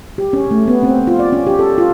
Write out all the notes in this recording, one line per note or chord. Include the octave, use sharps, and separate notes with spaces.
G4
C#4
A3
B3
C4
F4
D5
C#4
G4
A4
F4